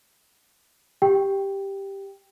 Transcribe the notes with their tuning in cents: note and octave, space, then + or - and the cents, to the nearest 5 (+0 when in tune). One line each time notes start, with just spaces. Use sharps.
G4 +0 G5 +0